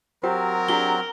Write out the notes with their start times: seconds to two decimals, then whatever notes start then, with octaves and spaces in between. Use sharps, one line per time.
0.23 F#3 C4 G4 A#4 C5
0.69 D4 G4 G#4 A#5 G7